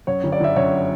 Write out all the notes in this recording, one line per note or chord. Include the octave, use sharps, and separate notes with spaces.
F#2 C#5
G1
D5
G1 E5
F#2 C#5